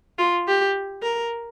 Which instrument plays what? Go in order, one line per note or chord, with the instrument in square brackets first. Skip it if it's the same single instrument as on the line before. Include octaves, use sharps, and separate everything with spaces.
[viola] F4
G4
A#4